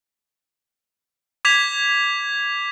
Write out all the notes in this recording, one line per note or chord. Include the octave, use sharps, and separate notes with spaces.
D6 G#6 B6 F7